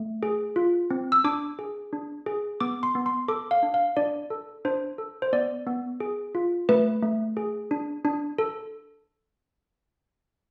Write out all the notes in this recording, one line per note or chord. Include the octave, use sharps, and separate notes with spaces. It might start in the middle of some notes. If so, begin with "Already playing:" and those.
Already playing: A3
G#4
F4
C4
E6
D4 D6
G#4
D4
G#4
B3 D6
C6
B3
C6
A4 D6
F5
D4
F5
D4 D5
A4
D4 C5
A4
C5
B3 D5
B3
G#4
F4
A3 B4
A3
G#4
D4
D4
A4